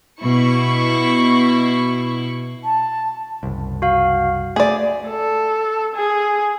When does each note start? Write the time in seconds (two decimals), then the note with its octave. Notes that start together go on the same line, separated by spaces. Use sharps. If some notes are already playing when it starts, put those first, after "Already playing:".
0.22 B2 E4 C#6
2.64 A5
3.43 F#1 C2
3.82 F#4 F5
4.56 A3 G#4 D5
5.09 A4
5.95 G#4